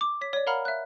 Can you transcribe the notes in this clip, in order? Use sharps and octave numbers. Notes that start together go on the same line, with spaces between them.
D6
C#5 B6
C#5 D5
A#4 F5 F#5 A#5 B5 F6
E5 F#6